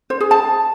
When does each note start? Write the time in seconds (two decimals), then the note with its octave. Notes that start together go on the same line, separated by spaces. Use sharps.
0.10 C5
0.20 G#4
0.31 A5